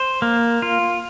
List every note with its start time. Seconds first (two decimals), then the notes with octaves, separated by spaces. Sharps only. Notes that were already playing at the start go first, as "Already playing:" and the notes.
Already playing: C5
0.22 A#3
0.62 F4